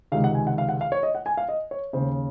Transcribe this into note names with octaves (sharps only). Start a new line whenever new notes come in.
C#2 C3 D#3 F5
F#5
G#5
F#5
F5
F#5
F5
C#5
D#5
F#5
G#5
F5
D#5
C#5
D#2 C#3 C5